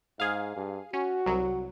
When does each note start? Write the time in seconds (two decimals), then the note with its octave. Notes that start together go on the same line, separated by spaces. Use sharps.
0.20 G#2 G#4 F5
0.56 G2
0.93 C#4 F#4
1.26 C2 F#3